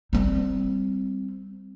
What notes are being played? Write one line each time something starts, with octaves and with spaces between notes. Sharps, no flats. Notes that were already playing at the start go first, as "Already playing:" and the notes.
G3 C4